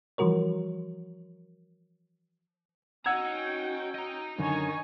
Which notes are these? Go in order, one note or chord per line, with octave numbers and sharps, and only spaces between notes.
E3 F3 G3 F#4 A#4 C#5
C#4 F#4 D#5 F#5 G5 A#5 E6 G#6
D#5 A#5
F#2 D3 D#3 C#5 G#5